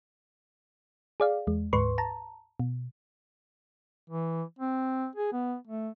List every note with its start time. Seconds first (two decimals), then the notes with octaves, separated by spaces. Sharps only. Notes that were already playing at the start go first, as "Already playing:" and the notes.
1.20 G#4 D5 F5
1.47 E2 G#3
1.73 D2 G#2 B4 C6 C#6
1.98 A5 A#5
2.60 B2
4.10 E3
4.59 C4
5.16 G#4
5.32 B3
5.67 A3